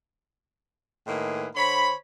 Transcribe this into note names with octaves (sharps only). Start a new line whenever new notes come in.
A2 D#3 G#3 A#3 G#4 B4
D3 C5 C#5 B5